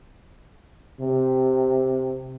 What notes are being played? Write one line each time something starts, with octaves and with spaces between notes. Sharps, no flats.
C3